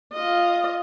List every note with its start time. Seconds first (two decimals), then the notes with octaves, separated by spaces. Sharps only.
0.13 F4 D#5